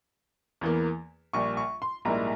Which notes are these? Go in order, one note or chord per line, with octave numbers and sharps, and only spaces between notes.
E2 E3 A#3
A#1 A#2 G3 C#6
C#6
C6
A#1 G#2 G3 A#3 E4 A#5